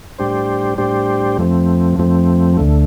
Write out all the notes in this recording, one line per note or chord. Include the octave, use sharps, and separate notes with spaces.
A2 G3 D4 G4 C5
A2 G3 D4 G4 C5
F2 F3 A3 C4
F2 F3 A3 C4
D2 D3 A3